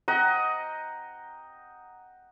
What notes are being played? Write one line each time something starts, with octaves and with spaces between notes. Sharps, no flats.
D#5 F#5 G5 A#5